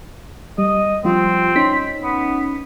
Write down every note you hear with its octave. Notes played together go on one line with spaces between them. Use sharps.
G3 D#5
F3 G3 C4 F4
C#4 D#4 B6
B3